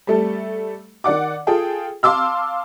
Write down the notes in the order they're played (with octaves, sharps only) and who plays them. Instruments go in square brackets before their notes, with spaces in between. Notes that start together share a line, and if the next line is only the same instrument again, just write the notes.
[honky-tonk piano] G3 A3 A4
D#3 D5 F#5 D6
F4 G#4 A4 G5 D#6
F5 A5 C6 D6 E6 F6